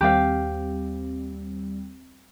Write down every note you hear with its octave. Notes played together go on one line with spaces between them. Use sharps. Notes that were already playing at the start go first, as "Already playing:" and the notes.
D#2 G3 C4 G4 F5